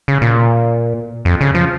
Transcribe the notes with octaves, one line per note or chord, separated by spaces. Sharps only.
C#3
A#2
F2
C#3
F3